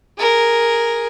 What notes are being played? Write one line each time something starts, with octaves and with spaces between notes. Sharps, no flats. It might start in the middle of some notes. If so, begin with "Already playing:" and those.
G#4 A#4